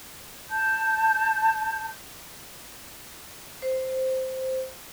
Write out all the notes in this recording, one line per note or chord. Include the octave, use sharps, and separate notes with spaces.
A5 G6
C5